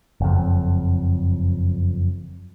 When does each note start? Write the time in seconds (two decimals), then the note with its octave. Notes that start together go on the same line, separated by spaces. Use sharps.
0.21 F#1 F2